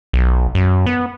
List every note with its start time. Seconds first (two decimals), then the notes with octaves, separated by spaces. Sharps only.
0.13 B1
0.55 F#2
0.86 B3